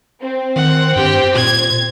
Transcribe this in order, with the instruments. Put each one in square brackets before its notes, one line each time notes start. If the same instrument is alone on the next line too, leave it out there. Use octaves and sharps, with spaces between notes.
[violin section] C4
[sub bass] D#3 [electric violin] F#5
[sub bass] G2 [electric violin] G4 G5
[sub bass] A#2 [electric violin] G#6